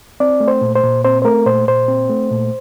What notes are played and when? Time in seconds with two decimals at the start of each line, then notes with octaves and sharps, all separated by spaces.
0.20 C4 D5
0.40 A3
0.48 C5
0.61 A#2
0.75 C5
0.83 A#2
1.04 C4 C5
1.22 C5
1.25 A3 A#4
1.46 A#2 C5
1.67 A#2 C5
1.88 C4
2.09 A3
2.31 A#2